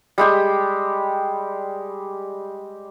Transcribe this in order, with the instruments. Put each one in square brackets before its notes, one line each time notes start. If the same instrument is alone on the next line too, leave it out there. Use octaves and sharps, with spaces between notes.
[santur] G3 G#3 G4